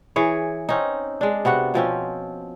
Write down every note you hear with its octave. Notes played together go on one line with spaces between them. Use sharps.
E3 G#4 C#5
C4 C#4 D#4
G#3 D4
C3 B3 F#4 F#5
B2 F3 C4 C#4